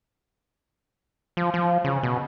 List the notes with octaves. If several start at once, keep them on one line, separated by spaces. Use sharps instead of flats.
F3
F3
C#3
B2